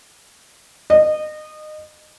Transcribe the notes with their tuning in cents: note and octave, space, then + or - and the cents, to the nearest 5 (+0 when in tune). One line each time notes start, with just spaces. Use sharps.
D#5 -25